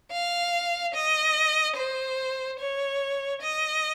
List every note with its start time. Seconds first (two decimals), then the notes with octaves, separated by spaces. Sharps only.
0.12 F5
0.94 D#5
1.76 C5
2.59 C#5
3.41 D#5